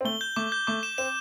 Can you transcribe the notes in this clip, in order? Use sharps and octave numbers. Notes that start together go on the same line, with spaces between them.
C4
A3 G7
G6
A3 D6
G6
A3 D6
E7
C4 E7